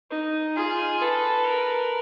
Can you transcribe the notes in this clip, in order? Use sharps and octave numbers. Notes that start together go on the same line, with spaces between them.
D#4
F4 G#4
A4 B4
A#4